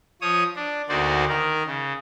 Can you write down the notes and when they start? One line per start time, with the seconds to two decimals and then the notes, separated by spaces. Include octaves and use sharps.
0.21 F3 C#5 D#6
0.56 D4
0.89 D2 A#3 D#4 F#4 C5 D5
1.29 D#3 A#4
1.66 C#3